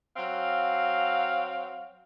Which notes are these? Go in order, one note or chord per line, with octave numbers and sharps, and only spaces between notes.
F#3 C4 F5